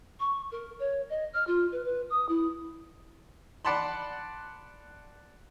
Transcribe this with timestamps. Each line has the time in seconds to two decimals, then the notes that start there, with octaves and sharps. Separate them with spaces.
0.20 C#6
0.52 A#4
0.79 C#5
1.10 D#5
1.33 F6
1.47 F4
1.72 B4
1.85 B4
2.10 D#6
2.29 E4
3.65 D5 F#5 A5 B5 C6